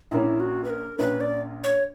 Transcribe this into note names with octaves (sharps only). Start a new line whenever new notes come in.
A#1 A#2 A#3 C#4 E4
F#4
B4
A#4
A#1 A#2 A#3 C#4 B4
D5
C#5